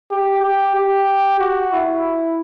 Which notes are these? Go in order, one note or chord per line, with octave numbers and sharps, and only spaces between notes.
G4
G4
G4
F#4
E4